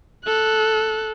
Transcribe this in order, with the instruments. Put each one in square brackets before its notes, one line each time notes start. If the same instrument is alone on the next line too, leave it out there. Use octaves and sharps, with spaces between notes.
[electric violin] A4 F#6